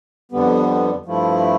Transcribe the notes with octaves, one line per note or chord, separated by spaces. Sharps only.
F2 D3 G3 B3
G2 F3 A3 E4